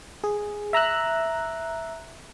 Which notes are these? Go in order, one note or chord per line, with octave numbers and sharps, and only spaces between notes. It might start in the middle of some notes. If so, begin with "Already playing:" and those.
G#4
E5 A#5 E6 F#6